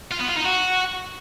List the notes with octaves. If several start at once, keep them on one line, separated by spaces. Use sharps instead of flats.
F4
B3
F4
D#4
F#4